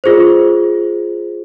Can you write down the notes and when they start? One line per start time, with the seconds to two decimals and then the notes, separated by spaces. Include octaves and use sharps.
0.04 F4 G#4 C5